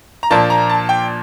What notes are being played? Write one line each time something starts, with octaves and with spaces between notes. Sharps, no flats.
A#5
A#2 F3 A#3 D4 A5
A#5
A5
G5